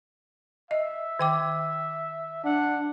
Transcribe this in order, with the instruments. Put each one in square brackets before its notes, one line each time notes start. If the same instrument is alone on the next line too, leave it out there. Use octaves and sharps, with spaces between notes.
[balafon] D#5 [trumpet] E5
[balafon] D#3 G5 D6
[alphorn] D4 [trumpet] F#5